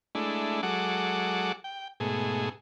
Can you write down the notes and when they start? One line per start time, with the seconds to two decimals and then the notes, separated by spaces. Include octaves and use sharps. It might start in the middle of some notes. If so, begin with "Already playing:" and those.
0.15 G#3 A3 D4 E4
0.63 F#3 G#3 A4 F#5 D6
1.64 G5
2.00 G#2 B2 A3 G#4